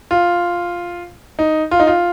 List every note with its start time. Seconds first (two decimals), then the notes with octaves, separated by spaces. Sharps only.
0.11 F4
1.39 D#4
1.71 F4
1.80 D#4
1.87 F4